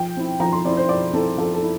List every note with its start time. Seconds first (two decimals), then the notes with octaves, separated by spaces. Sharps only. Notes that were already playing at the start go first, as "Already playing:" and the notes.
Already playing: F3 G5
0.17 C4 E4
0.40 F3 A#5
0.52 C6
0.65 C4 D5
0.68 E4
0.77 C5
0.89 F3 D5
1.13 C4 E4 A4
1.38 F3 A4
1.54 A4
1.63 E4